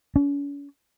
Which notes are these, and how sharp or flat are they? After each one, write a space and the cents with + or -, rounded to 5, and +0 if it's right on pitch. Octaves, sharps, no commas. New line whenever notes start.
C#4 +40